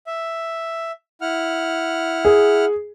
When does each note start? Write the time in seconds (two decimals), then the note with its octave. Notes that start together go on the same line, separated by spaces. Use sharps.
0.07 E5
1.21 E4 F#5 F6
2.25 G#4